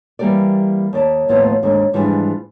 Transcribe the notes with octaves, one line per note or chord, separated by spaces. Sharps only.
E3 G3 A#3 G4 A#4 D5
D#2 D5 A5
D#2 A2 F3 A#3 B3
D#2 G#2 D3
G#2 E3 F3 G3 D4 G#4